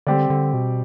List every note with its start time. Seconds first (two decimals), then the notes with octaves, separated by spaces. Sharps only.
0.07 D3 G3 C4 G4 D5
0.30 D3
0.53 B2